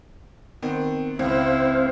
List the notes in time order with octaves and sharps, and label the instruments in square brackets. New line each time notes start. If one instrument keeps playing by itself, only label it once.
[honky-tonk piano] D#3 B3 C4
[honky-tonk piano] C#2 C#3 [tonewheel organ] C4 C5 F5 [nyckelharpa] E4